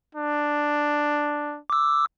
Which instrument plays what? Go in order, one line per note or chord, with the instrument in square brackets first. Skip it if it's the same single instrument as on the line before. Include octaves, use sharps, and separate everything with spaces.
[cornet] D4
[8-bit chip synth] D6 E6